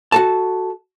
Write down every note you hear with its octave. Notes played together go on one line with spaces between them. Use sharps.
F#4 A4 A5